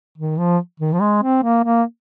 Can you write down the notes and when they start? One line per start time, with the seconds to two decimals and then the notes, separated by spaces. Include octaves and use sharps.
0.18 D#3
0.39 F3
0.80 D#3
0.93 F3
1.01 G#3
1.23 C4
1.43 A#3
1.64 A#3